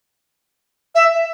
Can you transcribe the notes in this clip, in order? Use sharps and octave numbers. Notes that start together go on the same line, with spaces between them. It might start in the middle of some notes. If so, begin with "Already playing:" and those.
E5